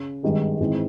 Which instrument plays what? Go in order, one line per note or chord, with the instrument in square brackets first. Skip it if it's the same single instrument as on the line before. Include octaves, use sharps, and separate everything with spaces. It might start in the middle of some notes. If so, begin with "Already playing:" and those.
Already playing: [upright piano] C#3
G#1 G2 D#3 G#3
G#1 G#2 E3 G#3 C4